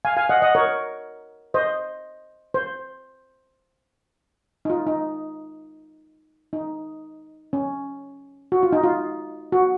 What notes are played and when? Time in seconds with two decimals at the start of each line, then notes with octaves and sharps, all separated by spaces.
0.05 F5 G#5
0.17 F5 G#5
0.29 D#5 F#5
0.42 D#5 F#5
0.55 A#4 C#5
1.54 C5 D#5
2.54 C5
4.65 D#4
4.70 F4
4.87 D#4
6.53 D#4
7.53 C#4
8.52 F#4
8.63 F4
8.72 D#4
8.83 F4
9.52 F#4